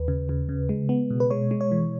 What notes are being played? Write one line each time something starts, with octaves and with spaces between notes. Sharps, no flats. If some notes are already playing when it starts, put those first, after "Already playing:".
Already playing: D#2 B4
C#3
C#3
C#3
G#3
B3
B2
B4
G#3 C#5
G#3
C#5
E3